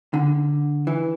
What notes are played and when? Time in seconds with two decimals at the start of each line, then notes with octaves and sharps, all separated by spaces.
0.14 D3
0.87 E3